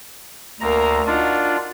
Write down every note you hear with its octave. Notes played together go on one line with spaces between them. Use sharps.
D2 A#3 A#5
D4 D#4 F4 F#4